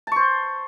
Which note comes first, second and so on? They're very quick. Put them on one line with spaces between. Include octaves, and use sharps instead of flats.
A5 C#6 C5